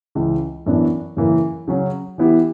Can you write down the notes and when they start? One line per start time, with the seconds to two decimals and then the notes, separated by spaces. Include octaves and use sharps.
0.15 C#2 C#3 E3
0.66 F#2 E3 B3 D4
1.17 F#2 C#3 E3 A#3
1.68 C#3 F#3 C#4
2.18 E3 B3 E4 G4